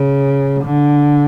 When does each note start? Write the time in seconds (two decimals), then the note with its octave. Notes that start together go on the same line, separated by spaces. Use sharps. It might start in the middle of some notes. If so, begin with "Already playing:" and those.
Already playing: C#3
0.64 D3